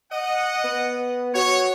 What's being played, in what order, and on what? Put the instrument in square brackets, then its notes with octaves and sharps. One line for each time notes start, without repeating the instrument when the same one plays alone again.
[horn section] D#5 F#5
[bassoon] B3
[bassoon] F#4 [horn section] C#5